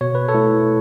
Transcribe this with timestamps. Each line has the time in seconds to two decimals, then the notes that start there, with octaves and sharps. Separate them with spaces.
0.01 B2 C#5
0.15 B4
0.28 A4 C#5
0.34 A3 E4